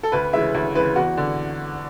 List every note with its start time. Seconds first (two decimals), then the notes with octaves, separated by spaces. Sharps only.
0.03 A4
0.12 D2 B4
0.33 C#3 E3 G#3 E5
0.54 D2
0.75 C#3 E3 G#3 B4
0.96 E2 F#4
1.17 D3